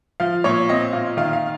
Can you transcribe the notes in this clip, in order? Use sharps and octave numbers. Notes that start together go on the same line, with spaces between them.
F3 F5
A#2 C#5
C4 D#5
A#2 F5
D#3 F5
F5